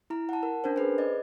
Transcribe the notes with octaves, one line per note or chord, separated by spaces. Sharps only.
E4 A#5
F#5 A5
A#4
C#4 D4 A#4 C5
G#4 B4 C5
D5 D#5